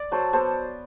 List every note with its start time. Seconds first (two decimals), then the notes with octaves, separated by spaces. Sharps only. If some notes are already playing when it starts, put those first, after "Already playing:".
Already playing: D5
0.11 F#3 A4 C5
0.33 B3 A4 C5